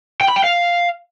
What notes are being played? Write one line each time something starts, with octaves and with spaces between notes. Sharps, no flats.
G5
B5
G5
F5